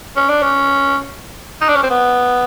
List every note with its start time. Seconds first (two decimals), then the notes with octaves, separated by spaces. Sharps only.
0.16 C#4
0.29 D4
0.42 C#4
1.61 D#4
1.69 D4
1.76 C#4
1.83 C4
1.90 B3